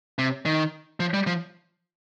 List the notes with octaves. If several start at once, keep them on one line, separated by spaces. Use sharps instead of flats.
C3
D#3
F3
G3
F3